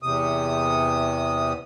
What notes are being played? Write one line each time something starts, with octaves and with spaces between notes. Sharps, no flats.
E2 C3 D#6